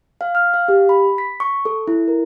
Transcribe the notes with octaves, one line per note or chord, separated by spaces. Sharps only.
F5
F6
F5
G4
B5
B6
C#6
A4
E4
A#4